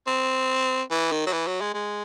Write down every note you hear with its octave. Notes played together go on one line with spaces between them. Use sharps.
C4
E3
D#3
F#3
E3
F#3
G#3
G#3